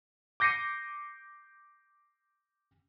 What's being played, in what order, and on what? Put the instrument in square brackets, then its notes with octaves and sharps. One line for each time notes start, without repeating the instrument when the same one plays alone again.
[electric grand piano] D6 G6 A#6 C7 C#7 D#7